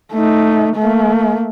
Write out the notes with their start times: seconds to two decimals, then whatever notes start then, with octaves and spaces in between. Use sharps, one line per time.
0.13 A3 D#4
0.76 A3 A#3